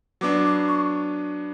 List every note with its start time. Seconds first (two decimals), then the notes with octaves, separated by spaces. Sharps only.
0.21 F#3 B3 D4 D6
0.46 D6
0.68 C#6